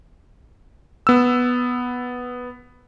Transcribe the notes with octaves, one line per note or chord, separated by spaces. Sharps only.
B3 E6